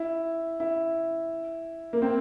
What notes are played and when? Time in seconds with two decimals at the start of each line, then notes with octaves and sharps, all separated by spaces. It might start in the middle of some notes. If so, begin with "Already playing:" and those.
Already playing: E4
0.60 E4
1.93 A#3
2.02 C4